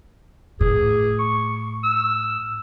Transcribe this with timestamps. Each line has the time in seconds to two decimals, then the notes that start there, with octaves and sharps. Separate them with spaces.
0.60 A2 G#4
1.19 C#6
1.83 E6